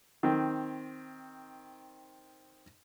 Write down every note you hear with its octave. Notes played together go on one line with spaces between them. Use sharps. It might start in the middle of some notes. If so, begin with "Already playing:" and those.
D#3 C4